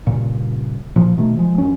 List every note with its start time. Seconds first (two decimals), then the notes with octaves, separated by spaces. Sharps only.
0.06 G2 A#2 C#3
0.96 A#2 F3
1.17 B2 D#3 A3
1.37 F3 G#3
1.58 E1 F#2 C#4